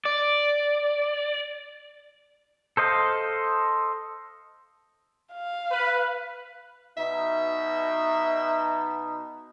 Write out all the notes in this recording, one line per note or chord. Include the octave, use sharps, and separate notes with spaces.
D5
A4 C5 D#5 F5
F5
B4
B2 D#4 E5